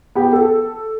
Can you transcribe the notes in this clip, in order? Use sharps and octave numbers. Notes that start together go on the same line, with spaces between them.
B3 G4
A4